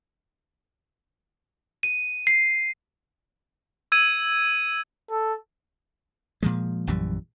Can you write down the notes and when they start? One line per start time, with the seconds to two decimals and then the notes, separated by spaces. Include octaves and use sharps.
1.83 D#7
2.27 C7
3.92 E6 G#6 D#7
5.10 A4
6.43 A#2 F3 G#3
6.87 A#1 F#2 E3 G3